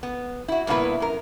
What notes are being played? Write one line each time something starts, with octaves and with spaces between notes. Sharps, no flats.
B3
E4 F#4
G2 A#2 A#3 B3 E4 B4
F#2 A#4